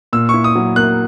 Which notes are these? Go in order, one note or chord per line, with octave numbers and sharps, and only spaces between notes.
A#2 E6
E4 C#6
D#6
F#3
A#3 F#6